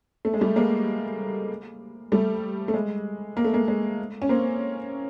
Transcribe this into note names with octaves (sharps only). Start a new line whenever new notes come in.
A3
G#3
G3 A3
G#3 A#3
G3 A3
A3
G#3
A#3
A3
G#3 A#3
G#3
C#4
A#3 C4